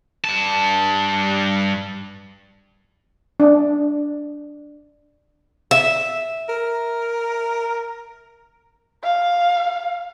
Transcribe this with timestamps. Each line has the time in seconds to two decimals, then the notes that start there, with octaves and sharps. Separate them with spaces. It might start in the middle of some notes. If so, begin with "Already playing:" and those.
0.25 G2 A5
3.40 D4
5.71 E5
6.49 A#4
9.04 F5